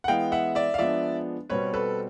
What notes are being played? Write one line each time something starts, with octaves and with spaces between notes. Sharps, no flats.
F#5
E3 G#3 B3 F5 G5
E5 F#5
D5 E5
F5
F3 G#3 B3 D4 D5 E5
B2 G3 C4 B4 C#5
A4 B4